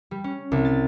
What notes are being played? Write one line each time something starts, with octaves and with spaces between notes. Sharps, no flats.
G3
C#4
C2
A6